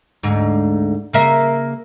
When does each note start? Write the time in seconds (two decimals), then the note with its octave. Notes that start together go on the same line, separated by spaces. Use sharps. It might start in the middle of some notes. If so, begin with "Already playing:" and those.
0.23 D2 G#2
1.13 C#3 A#3 E5